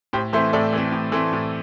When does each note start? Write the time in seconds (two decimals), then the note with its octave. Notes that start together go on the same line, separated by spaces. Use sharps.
0.13 A2 G4 C5
0.33 E3 A3 C4 C5 E5
0.53 A2 A4 D5
0.73 E3 A3 C4
0.92 A2
1.12 E3 A3 C4
1.33 A2